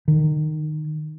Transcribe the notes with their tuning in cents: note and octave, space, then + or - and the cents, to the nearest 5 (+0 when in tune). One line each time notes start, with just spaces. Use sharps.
D#3 -20